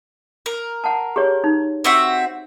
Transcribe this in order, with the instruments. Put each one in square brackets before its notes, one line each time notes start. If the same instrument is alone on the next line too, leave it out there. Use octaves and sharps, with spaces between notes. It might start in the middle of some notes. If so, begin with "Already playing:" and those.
[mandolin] A#4
[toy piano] F#5 A5
G4 G#4 C#5
D#4
[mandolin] C4 F#4 E5